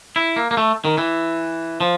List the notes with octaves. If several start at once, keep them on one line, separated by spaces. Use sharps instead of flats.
E4
A#3
A#3
A3
D#3
E3
F3